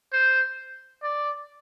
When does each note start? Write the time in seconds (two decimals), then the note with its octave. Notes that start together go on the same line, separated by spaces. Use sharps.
0.13 C5
1.03 D5